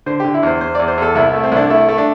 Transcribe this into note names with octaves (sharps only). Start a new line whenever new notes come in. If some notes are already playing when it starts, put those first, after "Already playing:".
D3 C5
D3 G4
E4
E2 C5
E2 C5
E2 D5
C5
E2 A4
C2 E4
A3 E4
C4
C2 D4 E4
A3 E4
A3
D4